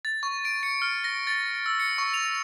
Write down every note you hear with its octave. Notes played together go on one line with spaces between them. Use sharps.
A6
C#6
D7
C#7
F6
A#6
A6
E6
C#7
C#6
F7